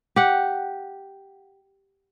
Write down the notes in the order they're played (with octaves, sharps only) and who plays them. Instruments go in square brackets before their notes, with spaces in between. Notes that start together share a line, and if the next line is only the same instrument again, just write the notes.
[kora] G4 F#5